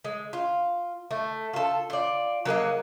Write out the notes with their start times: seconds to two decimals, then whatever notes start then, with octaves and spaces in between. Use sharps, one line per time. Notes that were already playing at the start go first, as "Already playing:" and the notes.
0.05 G#3
0.33 F4
1.11 A3
1.53 F4 A4
1.90 F4 D5
2.45 F#3 A#3 G#4 D#5